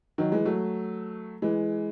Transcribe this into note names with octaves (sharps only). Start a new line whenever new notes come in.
D#3 F#3
E3 G#3
F#3 A3
E3 G#3